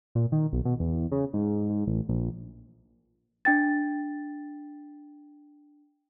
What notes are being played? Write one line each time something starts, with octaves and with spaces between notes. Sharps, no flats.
A#2
D#3
B1
B2
E2
C#3
G#2
G#2
A1
A#1
D4 G5 A6